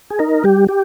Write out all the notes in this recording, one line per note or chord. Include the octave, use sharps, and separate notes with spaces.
G#4
D#4 A#4
G3 G4
G4